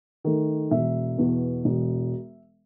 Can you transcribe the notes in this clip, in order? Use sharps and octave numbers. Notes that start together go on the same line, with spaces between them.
D#3 A3
E1 E5
E2 B2
E1